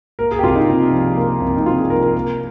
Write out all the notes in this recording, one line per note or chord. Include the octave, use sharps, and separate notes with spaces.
A#3 A#4
G#4
G4
C2 F4
D#4
C3
F3
A#3
C2
D#4
C3 F4
G#4
F3 A#4
A#4
A#3